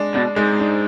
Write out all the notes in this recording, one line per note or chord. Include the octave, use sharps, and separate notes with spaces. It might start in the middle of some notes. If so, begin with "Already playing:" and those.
Already playing: G#3 D4
B2 D4
G#2 G#3
D4